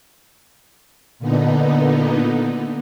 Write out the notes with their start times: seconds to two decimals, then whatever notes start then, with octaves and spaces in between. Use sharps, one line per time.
1.19 A#2 D3 B3 D#4